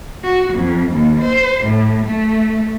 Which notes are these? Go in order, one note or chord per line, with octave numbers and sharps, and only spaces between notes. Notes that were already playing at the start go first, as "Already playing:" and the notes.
F#4
F2
D#2
C5
A2
A3